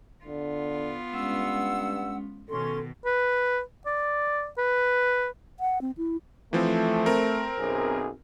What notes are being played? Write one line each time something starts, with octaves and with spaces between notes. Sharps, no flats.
D3 B3 F4
G2 G#3 C#4 F#5 E6
B2 D#3 C#4 A4 C6
B4
D5
B4
F#5
C4
E4
E3 F3 A3 C4
C4 A#4
B1 F#2 G#4